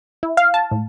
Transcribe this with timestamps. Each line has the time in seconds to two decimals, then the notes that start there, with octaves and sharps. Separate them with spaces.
0.23 E4
0.37 F5
0.54 A5
0.71 A2